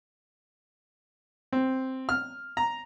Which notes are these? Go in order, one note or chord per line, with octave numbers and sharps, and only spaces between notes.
C4
F6
A#5